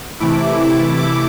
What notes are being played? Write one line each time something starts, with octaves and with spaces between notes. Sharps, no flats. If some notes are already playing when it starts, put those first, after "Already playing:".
C3 E3 A3 E4 D6
D6